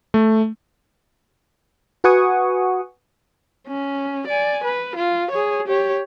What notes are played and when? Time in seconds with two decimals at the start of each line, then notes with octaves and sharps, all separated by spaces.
0.14 A3
2.04 F#4 B4 F#5 G#5 C#6 D#6
3.67 C#4
4.27 D5 G#5
4.64 B4
4.96 F4
5.31 G#4 C#5
5.68 G4 C#5